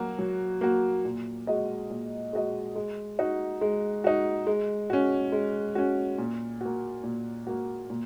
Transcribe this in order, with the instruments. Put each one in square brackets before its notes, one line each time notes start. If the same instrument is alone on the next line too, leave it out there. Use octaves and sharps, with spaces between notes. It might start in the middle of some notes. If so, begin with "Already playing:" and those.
Already playing: [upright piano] F#3 A#3 F#4
F#3
A#3 F#4
A#2
G#3 F#4 D#5
A#2
G#3 F#4 D#5
G#3
D#4 F#4
G#3
D#4 F#4
G#3
C#4 F#4
G#3
C#4 F#4
A#2
A#3 F#4
A#2
A#3 F#4
A#2